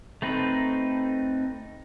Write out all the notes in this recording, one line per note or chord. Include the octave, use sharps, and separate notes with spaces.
A3 C4 D#4 B4